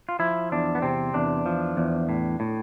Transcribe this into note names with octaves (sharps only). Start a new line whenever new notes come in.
F4
F3 E4
E2 D4
B3
C3 C4
E2 D4
F3
E2
A2
A2